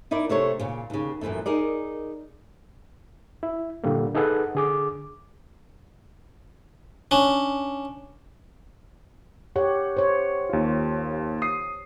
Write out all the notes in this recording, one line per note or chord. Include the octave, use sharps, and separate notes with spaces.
D#4 E4 A#4 D5
C3 A3 D4 C#5
A#2 C#3
D#2 C#3
F#2 A#2 C#3 E3 A3
D#4 G#4 A#4 D5
E4
A#2 D3 G3 A#3
D#4 G#4 A4 B4 F#5
D3 G#4 D6
C#4 D4
G4 C#5 F#5
C5 C#5
D#2 F4
D#6 C7